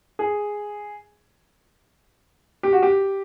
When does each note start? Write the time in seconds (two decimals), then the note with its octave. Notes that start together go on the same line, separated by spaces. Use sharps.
0.19 G#4
2.63 G4
2.73 F#4
2.83 G4